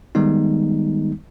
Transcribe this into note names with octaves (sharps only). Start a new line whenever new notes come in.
D#3 G3 G#3 B3 D#4